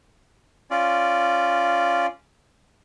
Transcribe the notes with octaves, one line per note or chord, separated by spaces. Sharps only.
C#4 F4 D5